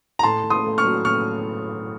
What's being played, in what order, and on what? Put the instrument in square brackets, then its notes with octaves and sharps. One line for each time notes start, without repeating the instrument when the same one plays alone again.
[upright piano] A#5
[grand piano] A2 [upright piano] A5 C6
[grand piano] A2
[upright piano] C6 D#6
[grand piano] A3
[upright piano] C#6 F6
[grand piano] F#3
[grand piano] A2 [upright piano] C#6 F6